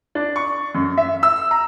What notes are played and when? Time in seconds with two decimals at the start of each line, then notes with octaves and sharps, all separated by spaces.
0.15 D4
0.36 C#6
0.75 F#2
0.97 E5
1.23 E6
1.51 A#5